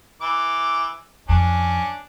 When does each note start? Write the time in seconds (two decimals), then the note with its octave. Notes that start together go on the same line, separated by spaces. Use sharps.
0.21 E3 D6
1.29 F2 C#4 D4